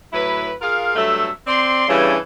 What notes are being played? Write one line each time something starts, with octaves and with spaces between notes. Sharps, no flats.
A2 F#3 E4 B4
F4 G#4 A#4 F5
G2 F#3 A3 A4 E5
C4 D5 C6
G2 C#3 E3